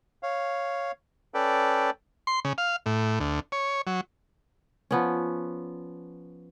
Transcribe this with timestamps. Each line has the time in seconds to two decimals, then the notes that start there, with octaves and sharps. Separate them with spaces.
0.23 C#5 F5
1.34 C#4 A4 B4 D5 G5
2.27 C6
2.45 C#3
2.58 F5
2.86 A2
3.20 D2
3.52 C#5
3.87 F#3
4.91 F3 B3 C#4